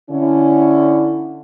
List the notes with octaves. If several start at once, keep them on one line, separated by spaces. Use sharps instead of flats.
D3 C#4 E4